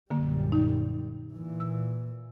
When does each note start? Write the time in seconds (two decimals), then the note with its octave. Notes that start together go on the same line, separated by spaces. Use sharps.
0.10 A#1 F#2 D3 G3 A#3
0.52 D#4
1.32 A#2 E3
1.60 E6